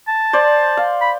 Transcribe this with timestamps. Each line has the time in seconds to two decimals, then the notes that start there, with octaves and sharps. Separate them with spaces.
0.08 A5
0.33 C5 D5
0.77 F5
1.01 B5